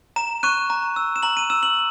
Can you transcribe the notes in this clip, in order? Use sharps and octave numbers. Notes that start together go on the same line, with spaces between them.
A#5 E7
C#6 F#6 D#7
A#5
E6
E7
A#5 F#7
D#7
E6 E7
F#7